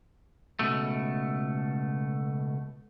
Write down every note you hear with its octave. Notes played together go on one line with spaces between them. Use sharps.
C#2 B2 A3